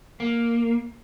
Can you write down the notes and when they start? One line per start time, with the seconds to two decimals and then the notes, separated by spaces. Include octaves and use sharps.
0.20 A#3